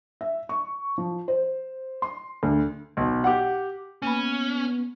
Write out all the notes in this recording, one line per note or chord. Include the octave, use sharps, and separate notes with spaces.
E5
C#6
F3
C5
C6
D2
B1
G4 F#5
A#3 B3 C#4 G#5 B5